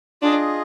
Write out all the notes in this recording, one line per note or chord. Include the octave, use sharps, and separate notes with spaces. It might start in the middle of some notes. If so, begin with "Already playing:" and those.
D4 F4 G#4 D#5